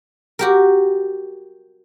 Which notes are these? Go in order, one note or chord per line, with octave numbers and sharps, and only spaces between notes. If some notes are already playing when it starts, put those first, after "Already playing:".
F#4 G4 A#4